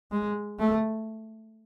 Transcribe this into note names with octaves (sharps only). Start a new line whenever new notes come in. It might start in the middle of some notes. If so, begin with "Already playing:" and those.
G#3
A3